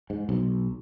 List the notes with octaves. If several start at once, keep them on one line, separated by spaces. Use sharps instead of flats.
G#2
B1